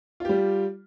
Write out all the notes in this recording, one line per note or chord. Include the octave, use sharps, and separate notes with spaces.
G3 F4 G4